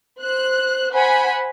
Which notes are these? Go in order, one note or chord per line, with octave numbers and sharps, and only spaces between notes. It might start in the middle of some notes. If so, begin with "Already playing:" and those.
C5 F#6
C5 F#5 G#5 B5